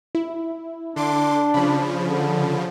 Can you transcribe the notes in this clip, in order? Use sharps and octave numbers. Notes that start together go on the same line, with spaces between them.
E4
D3 D4 C6 D6
C#3 F3 B5
D3